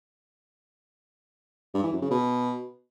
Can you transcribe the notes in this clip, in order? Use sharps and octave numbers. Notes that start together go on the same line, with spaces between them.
G2
E3
F#2
C#3
B2